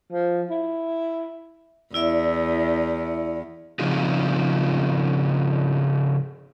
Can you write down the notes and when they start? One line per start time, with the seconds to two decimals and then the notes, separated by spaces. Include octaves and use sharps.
0.12 F3
0.51 E4
1.94 E2 E4 D5 E5
3.79 C#3 F3 C4 D#4 F4 G#4